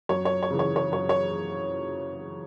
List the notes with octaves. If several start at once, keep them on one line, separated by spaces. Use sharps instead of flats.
F#2 C#5
C#5
C#5
C#3 E3
C#5
C#5
F#2 C#5
C#5